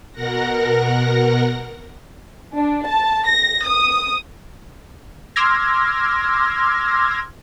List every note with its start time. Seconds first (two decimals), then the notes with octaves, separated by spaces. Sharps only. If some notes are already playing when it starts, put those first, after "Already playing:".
0.12 B2 A#4 F#5 A#6
2.57 D4
2.87 A5
3.29 A#6
3.67 D#6
5.36 C6 D6 E6 F6 G#6 A#6